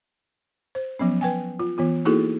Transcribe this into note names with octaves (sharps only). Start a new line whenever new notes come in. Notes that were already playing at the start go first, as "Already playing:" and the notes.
C5
F3 F#3 B3 C#4
B4 G5 G#5
F4
E3 B3 F4
A#3 D#4 E4 F#4 G#4 A4